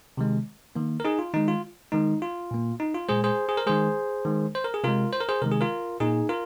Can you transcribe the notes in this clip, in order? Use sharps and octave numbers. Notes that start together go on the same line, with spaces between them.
C3 D#3 G#3
D#3 A#3
A#4
D#4 G#4
F4
D#3 G#3 D#4
F4
D#3 G#3 D#4
F4
A#2 A#3
D#4
F4
A#2 G#3 G#4 C5
G#4 C5
G#4
A#4
D#3 G#3 G#4 C5
D#3 G#3
C5
A#4
G#4
C3 G#3 F4 A#4
C5
A#4
G#4 C5
C3 D#3 G#3 A#4
G#4
F4 A#4
A#2 A#3 D#4 G#4
F4 A#4